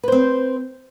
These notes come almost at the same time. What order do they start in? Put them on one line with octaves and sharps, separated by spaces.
B4 C5 C4